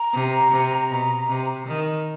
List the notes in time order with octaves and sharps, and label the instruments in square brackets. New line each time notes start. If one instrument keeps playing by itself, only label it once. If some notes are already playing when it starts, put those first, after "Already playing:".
Already playing: [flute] A#5
[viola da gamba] C3
C3
B2
C3
D#3